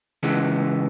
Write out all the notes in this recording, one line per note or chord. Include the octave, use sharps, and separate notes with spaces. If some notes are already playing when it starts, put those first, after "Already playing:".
C#3 E3 G#3 B3